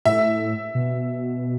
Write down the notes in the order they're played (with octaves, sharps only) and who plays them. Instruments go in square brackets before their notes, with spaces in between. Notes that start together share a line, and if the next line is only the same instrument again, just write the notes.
[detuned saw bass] A2 [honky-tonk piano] E5
[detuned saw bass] B2